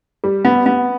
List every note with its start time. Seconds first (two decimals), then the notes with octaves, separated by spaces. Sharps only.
0.24 G3
0.45 B3
0.66 B3